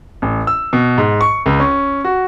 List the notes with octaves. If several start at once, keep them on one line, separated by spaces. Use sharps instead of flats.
A1
E6
B2
G#2
C#6
C#2
C#4
F#4